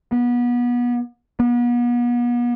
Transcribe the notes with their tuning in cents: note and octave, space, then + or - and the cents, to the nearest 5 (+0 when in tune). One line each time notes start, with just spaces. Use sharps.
B3 -25
B3 -40